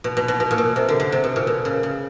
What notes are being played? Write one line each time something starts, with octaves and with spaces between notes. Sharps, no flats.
B2
B2
B2
B2
A#2
B2
C3
D3
D3
C3
B2
A#2
B2
C#3
C#3